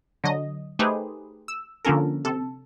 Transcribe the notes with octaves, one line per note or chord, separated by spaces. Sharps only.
D3 F#3 D#5
A3 D#4 G4 G#4 B4 C5
E6
D3 F3 A#3 C#4 A4 A#4
C3 A4